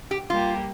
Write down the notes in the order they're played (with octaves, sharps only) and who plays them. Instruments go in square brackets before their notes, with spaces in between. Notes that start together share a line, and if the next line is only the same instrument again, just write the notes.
[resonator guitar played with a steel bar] G4
[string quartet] G3 A#3 G4 [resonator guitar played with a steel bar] F4